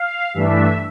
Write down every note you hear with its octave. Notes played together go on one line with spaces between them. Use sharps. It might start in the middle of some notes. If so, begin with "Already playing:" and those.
Already playing: F5
G2 E3 A3 D4 E5